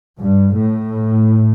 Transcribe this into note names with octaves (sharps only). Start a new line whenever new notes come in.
G2
A2